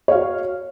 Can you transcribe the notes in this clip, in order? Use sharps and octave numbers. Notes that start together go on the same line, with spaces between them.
F#4 C#5 F5